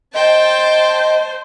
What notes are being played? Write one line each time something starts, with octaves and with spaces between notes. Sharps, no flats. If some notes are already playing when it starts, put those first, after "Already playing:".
C5 D#5 G5 A5